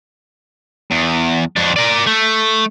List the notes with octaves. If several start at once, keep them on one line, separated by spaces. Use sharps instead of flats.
E2
F2 D4
A#4 D5
A3